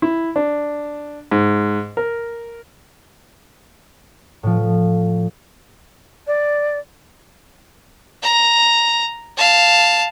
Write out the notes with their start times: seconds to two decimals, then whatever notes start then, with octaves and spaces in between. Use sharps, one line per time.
0.02 E4
0.36 D4
1.31 G#2
1.97 A#4
4.43 A2 F3
6.26 D5
8.23 A#5
9.38 F5 A5